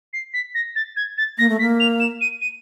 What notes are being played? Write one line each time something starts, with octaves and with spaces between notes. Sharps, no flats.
C7
B6
A#6
A6
G#6
A6
A#3 A#6
A3
A#3 B6
F7
E7
D#7
D#7